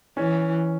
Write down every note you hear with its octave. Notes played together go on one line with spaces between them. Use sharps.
E3 C#4